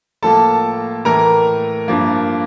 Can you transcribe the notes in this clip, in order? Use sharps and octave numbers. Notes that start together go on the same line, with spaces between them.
A2 F3 A#3 A4 A5
A2 E3 A3 A#4 A#5
G2 F3 A#3